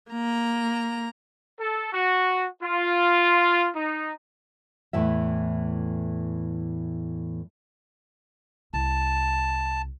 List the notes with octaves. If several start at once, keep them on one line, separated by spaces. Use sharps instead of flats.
A#3 A#5
A4
F#4
F4
D#4
E2 A2 E3 E5
C2 A5